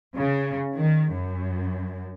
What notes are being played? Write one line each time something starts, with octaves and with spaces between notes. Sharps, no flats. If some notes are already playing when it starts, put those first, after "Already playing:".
C#3
D#3
F#2